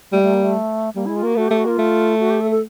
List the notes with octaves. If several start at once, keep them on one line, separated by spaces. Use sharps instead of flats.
G3 A3
A3
A#3
A3
G3 A#3
G#3 E4
F4
A#3 F#4
A3 F#4
A3 G4
F#4
A#3 F4
A3
F#4
G4
A4
A4